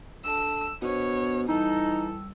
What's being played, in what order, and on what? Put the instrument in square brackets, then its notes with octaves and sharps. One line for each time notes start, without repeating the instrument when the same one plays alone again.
[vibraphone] D4 A4 A5 [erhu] E6
[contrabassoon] B2 [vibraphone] B3 D4 C5 [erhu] C#5
[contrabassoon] E3 [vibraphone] G3 E6 [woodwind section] D#4 [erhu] A4